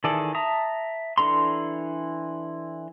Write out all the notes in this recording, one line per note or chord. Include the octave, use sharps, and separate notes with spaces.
D#3 E3 G#4 A4 D5
E5 A5 A#5 D#6
E3 D4 A4 A#5 C6